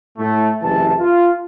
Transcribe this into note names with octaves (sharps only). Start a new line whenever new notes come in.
A2 A3
F#1 C3 E3 A5
F4